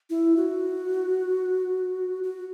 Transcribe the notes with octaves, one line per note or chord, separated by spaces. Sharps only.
E4
F#4
F#4